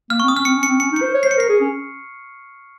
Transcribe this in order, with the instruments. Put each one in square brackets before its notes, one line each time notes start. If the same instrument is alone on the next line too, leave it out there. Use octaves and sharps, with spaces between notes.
[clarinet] A#3 [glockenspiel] F6
[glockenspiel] C#6
[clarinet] C4
[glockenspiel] D#6
[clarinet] C#4 [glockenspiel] F6
[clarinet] C4 [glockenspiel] C#7
[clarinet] C#4
[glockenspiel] C#7
[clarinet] C4
[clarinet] C#4 [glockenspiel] C#7
[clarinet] D#4
[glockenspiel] C#7
[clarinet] C5
C#5
[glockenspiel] C7
[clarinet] C5
[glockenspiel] C#7
[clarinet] A#4 [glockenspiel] C7
[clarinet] G#4
C#4